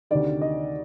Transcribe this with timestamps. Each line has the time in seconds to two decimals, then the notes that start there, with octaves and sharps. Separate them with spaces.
0.11 D2 C3 D#3 D5
0.41 D#5